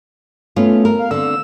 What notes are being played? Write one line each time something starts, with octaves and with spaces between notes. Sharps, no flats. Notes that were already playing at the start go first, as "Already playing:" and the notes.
A3 B3 C#4 F4
A#4
F5
D3 C4 E6